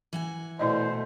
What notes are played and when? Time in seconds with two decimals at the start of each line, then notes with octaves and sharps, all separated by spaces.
0.13 E3 F#5 G#5
0.59 B2 A3 E4 C5 D5 D#5